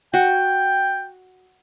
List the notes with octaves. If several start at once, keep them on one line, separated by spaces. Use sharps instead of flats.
F#4 G5